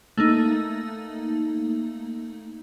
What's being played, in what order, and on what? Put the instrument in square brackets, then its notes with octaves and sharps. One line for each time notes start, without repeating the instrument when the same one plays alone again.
[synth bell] A3 A#3 D#4